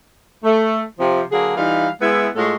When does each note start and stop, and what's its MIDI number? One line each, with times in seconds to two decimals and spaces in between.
0.44 0.82 57
0.99 1.21 48
0.99 1.21 53
1.32 1.55 50
1.32 1.55 54
1.32 1.55 58
1.32 1.55 68
1.56 1.88 52
1.56 1.88 55
1.56 1.88 63
1.56 1.88 65
1.56 1.88 77
2.01 2.28 56
2.01 2.28 59
2.01 2.28 64
2.36 2.54 45
2.36 2.54 56
2.36 2.54 65
2.36 2.54 69
2.36 2.54 73